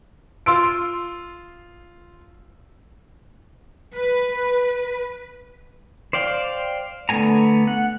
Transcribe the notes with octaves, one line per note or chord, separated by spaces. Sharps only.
F4 C6 E6 D7
B4
C5 D5 F5 G5
D3 A3 B3 G#5 A#5
F#5